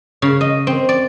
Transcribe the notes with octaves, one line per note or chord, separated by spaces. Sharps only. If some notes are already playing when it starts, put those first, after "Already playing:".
C#3
D#5
C4
D5